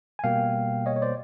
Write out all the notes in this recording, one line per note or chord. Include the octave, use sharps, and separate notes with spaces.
G#5
B2 G3 A#3 F5 G5
C#5 D#5
C#5
C5 D5